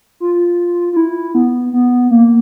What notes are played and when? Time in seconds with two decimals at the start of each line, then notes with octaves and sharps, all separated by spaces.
0.20 F4
0.93 F4
0.97 E4
1.35 B3
1.73 B3
2.11 A#3